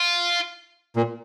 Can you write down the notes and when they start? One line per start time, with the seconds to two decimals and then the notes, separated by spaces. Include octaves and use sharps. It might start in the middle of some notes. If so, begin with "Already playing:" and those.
Already playing: F4
0.96 A#2